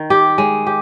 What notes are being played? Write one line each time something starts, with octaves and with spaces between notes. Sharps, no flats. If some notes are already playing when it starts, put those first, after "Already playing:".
Already playing: D#3
G4
G#3
G4